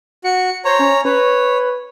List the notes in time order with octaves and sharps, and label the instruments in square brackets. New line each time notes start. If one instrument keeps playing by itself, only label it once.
[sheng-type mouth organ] F#4 [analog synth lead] C#7
[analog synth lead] C5 [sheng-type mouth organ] C#5 A#5
[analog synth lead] C#4
[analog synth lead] B4 [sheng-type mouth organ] C#5